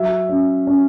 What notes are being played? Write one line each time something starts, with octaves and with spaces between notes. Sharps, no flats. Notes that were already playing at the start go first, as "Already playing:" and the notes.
Already playing: F#3 E5
C#4
C#4